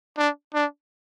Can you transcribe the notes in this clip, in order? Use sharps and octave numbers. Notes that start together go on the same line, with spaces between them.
D4
D4